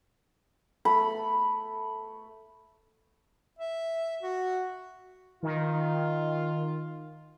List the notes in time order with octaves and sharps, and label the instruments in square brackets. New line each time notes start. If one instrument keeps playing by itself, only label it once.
[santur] A3 [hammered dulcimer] B5
[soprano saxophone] E5
F#4
[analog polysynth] D#3 [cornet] F4